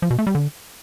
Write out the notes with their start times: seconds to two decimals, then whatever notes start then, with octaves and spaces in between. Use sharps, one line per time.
0.02 F3
0.10 B2
0.19 A3
0.27 G3
0.35 D3